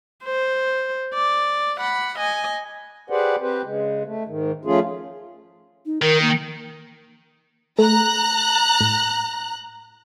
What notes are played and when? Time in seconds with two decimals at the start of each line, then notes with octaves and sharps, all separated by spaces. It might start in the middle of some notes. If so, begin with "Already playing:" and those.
0.24 C5
1.14 D5
1.80 F#5 B5
2.18 D#5 G#5
3.10 G4 G#4 B4 C5 D5 F#5
3.40 C4 G4 B4 C5
3.64 C#3 G#3
4.06 A3
4.26 G#2 D#3
4.65 F3 A3 C#4 F4 G#4
5.86 D#4
6.02 D#3 A#4
6.22 A#3
7.79 A3 A#5 F#6
8.81 A2